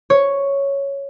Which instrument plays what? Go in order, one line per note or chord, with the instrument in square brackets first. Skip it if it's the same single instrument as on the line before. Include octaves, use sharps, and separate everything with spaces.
[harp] C#5